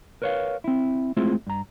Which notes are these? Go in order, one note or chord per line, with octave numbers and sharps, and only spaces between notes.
A#4 B4 C#5 D#5 F5
C4 E4
G#3 A3 C4 E4 F4 G#4
G2 A#5